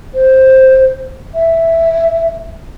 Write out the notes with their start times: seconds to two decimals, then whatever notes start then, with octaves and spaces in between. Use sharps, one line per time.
0.15 C5
1.35 E5